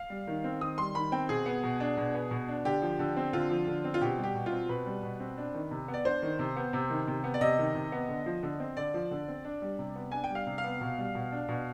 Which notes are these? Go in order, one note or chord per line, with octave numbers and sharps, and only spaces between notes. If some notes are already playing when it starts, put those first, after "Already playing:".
Already playing: F5
G3
D#3
C4
D#3 D#6
G3 C6
D#3 B5
C4 G5
B2 G#4
B3
B2
D4
B2
B3
B2
D4
D3 G4
F3
D3
C4
D3 F4
F3
D3
C4
F4
B2 G4
G3
G4
B2
F4
C4
B2 B4
G3
B2
C4
D4
D#3
C3
B3
D5
D4 C5
D#3
C3
B3
C3
D#3
C3
B3
D5
C3 D#5
D#3
C3
B3
D3
F3
D3
C4
D3 D5
F3
D3
C4
D4
G3
C3
B3
D4 G#5
G5
G3 F5
C3
F5
B3
B2
G3
B2
D4
B2